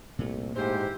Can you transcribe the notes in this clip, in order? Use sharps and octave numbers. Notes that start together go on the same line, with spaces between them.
C2 A#2 A3
G#2 E3 G4 C5